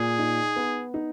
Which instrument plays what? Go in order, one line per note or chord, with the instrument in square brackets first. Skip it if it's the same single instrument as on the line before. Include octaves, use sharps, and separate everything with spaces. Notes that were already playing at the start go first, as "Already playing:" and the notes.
Already playing: [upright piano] A#2 [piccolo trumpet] G#4
[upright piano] D#4
B3
D#4